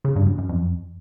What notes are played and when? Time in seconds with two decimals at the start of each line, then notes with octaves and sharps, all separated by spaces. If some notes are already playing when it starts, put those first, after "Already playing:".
0.04 C#3
0.16 G2
0.27 F#2
0.38 F#2
0.49 F2